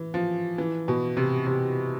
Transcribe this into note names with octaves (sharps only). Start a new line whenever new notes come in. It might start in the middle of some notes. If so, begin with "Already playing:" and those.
Already playing: E3
F3
E3
B2
C3
C3